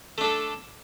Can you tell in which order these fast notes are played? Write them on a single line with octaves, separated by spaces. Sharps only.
A3 D4 A4